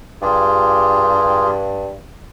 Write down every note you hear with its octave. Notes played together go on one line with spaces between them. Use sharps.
G2 F4 G4 G#4